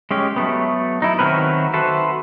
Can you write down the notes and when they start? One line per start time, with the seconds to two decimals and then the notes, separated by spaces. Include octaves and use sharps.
0.11 G#3 C#4 G4
0.36 F#3 A3 B3
1.02 D#4 E4
1.19 D#3 F#3 A3 C4 A#4 B4
1.74 F#4 A4 B4 C5 E5